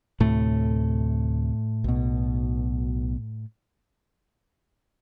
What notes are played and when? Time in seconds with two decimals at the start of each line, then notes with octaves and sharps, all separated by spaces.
0.20 D2 A2 C3 A3
1.84 B1 B2